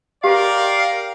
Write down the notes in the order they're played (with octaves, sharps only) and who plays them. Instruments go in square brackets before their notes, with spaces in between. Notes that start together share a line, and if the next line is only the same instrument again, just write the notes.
[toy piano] G4 [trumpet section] A#4 D5 G5 [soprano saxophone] F5